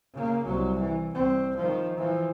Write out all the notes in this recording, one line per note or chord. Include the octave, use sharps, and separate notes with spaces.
C#3 A#3
C2 F#3
E3
C2 C4
D#3 F3
E3 F3